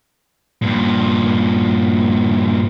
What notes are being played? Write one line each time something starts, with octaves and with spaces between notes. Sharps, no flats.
G2 A#2